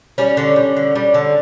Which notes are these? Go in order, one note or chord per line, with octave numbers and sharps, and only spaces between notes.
G3 C#4
D3
G3
D3
G3
D3